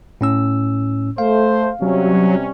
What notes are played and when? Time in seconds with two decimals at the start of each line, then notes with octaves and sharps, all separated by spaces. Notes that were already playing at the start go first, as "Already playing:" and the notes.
0.21 A2 C#4 E6
1.18 A3 C5 F5
1.82 C3 F#3 G3 C#4